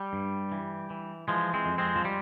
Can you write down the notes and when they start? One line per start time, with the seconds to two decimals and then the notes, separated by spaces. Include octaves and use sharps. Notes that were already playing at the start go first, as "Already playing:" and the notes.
Already playing: G3
0.13 G2
0.52 E3
0.90 E3
1.28 E3 F3 G#3
1.54 G#3 C4
1.66 F2
1.78 G#3 C4
1.96 F3
2.05 G3